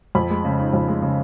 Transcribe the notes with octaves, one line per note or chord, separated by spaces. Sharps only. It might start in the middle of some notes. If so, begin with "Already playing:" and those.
F2 B5
G#3
C#3
D#4
F2
G#3
C#3